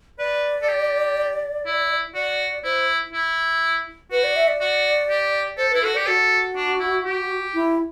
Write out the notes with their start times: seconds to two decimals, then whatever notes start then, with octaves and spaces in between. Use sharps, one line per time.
0.19 B4 D5
0.62 A4
0.69 G4
1.66 E4
2.15 F#4 D5
2.64 E4 C5
3.13 E4
4.11 F#4 B4
4.24 D5
4.36 E5
4.48 D5
4.61 F#4
5.10 G4
5.57 A4 C5
5.71 E4 B4
5.82 F#4 A4
5.94 G4 D5
6.07 F#4 A4
6.56 D4
6.80 E4
7.05 G4
7.54 E4